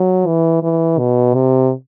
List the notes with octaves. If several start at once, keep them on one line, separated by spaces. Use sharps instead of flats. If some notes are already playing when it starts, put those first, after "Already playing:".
Already playing: F#3
E3
E3
B2
C3